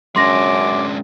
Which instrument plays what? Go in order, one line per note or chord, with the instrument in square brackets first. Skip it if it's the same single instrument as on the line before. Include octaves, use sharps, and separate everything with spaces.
[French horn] F#2 [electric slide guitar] G#3 C#4 D4 [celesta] C6 A#6 [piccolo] D6